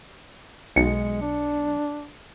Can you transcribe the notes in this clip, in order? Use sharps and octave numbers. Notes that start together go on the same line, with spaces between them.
B1 G#3 C#7
D4